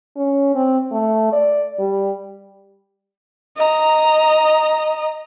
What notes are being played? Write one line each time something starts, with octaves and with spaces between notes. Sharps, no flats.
C#4
C4
A3
D5
G3
D#5 A#5